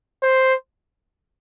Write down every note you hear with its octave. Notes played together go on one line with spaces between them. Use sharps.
C5